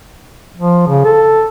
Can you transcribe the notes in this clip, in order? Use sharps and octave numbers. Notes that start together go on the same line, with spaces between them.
F3
C#3
A4